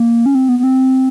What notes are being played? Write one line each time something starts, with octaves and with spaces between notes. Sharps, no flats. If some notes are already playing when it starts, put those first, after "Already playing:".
Already playing: A#3
C#4
C4
B3
B3
C4